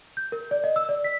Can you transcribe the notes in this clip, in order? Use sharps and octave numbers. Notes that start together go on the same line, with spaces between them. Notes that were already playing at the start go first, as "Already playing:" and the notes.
G6
A#4
D5
D#5
E6
D5
B6